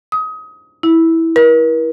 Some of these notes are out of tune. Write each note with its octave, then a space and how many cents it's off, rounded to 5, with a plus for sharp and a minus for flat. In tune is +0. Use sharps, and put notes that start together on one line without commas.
D#6 +25
E4 -10
A#4 +45